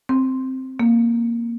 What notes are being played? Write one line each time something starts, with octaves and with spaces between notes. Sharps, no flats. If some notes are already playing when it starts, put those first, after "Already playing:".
C4
A#3